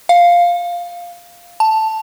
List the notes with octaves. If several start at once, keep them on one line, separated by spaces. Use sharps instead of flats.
F5
A5